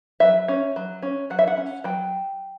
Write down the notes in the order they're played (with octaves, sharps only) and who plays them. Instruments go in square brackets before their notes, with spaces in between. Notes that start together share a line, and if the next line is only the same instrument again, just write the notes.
[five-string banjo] F#3 E5
C#4
F#3
C#4
F#3 F#5
E5
F#5
C#4
F#3 G5